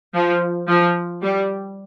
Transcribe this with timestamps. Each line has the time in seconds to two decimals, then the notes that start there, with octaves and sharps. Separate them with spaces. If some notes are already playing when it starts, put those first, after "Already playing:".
0.14 F3
0.67 F3
1.22 G3